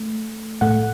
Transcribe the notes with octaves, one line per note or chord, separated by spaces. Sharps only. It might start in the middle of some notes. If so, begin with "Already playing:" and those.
Already playing: A3
A2 A3 F#5